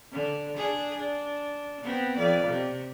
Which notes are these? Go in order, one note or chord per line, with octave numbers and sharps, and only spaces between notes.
D3
D4 G#4
D4
B3 C4
F2 D5
C3